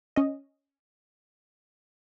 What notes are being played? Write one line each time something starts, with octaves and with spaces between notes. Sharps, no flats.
C#4 D#5